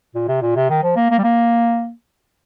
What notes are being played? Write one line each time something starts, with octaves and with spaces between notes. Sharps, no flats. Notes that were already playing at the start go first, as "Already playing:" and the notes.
A#2
C3
A#2
C3
D#3
F3
A#3
A#3
G3
A#3